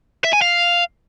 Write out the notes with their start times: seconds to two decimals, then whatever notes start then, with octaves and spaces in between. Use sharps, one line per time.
0.24 E5
0.33 G#5
0.42 F5